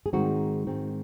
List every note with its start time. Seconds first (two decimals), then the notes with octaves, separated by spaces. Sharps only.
0.06 G#4
0.13 G#2 D#3 G#3 C4 D#4 F#4
0.67 G#2 D#3 G#3 C4